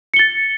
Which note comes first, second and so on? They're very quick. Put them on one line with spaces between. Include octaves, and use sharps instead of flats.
C#7 G7 A6